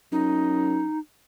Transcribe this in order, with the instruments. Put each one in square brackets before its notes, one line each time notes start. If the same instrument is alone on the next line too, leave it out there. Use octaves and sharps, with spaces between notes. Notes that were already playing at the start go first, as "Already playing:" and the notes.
[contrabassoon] F#2 [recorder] D#4